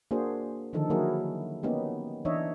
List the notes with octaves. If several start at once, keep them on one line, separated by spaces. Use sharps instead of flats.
A#3 D4 F#4 G#4 C5
D3 D#3 F3 D#4 A4
F#3 A#3 E4 F#4 G#4 A#4
A#3 B3 C#4 D#4 G4
E3 D4 D#4 C#5 D#5 E5